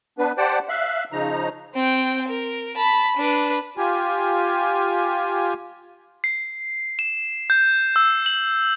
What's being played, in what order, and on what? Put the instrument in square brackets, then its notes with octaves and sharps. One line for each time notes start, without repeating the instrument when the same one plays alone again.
[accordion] B3 D4 B4
G4 C5 D5 F#5 G5 A5
E5 F5 F#6
C#3 F3 D#4 A#5
[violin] C4 G5
A#4
A5 B5
D4 B4
[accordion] F4 G4 G#5
[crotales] C7
E7
G6
E6
F#7